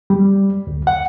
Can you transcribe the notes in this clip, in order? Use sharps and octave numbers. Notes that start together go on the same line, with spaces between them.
G3
D2
F#5